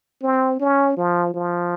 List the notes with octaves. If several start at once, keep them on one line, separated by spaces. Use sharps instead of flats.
C4
C#4
F3
F3